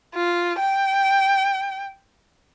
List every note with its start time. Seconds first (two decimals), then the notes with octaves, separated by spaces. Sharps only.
0.14 F4
0.59 G5